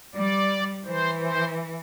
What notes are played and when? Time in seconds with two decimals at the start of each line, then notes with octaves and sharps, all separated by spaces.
0.15 G3 D5
0.85 E3 C5
1.20 C5